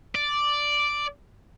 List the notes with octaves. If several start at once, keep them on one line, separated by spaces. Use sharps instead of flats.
D5